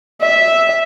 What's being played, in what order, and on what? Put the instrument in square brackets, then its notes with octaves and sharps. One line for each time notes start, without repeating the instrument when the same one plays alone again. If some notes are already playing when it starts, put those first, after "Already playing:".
[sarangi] E5